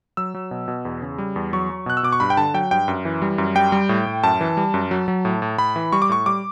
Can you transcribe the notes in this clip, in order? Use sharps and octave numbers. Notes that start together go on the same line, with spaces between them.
F#3 E6
F#3
B2
B2
E2
C#3
G3
E2
F#3 C#6
F#3
B2 F#6
E6
B2 D6
C#6
G2 B5
G5
D3 A5
F#3 G5
G2 G5
F#2
E3
G3
F#2
G3 G5
G3
A2
A2
F#2 A5
E3
G3
F#2
F#3
F#3
A2
A2
A2 B5
E3
G3 C#6
D6
A2 C#6
G3 D6